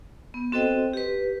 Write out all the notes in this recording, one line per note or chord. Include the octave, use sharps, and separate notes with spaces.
B3
C4 F#4 A4 C5 D#5 G5
G4 B4